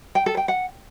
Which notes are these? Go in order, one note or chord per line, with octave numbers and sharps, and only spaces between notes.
G5
A4
G5
F#5